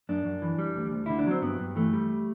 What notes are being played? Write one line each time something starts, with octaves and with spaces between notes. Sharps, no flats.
F#2 D4
F#2
E3
G3
D2
D2
D3 E4
D4
F#3 C4
G2 B3
G2
E3 A3
G3